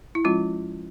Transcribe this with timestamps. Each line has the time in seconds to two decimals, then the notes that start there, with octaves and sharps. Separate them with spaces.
0.15 E4
0.25 F3 G#3 C#4 F4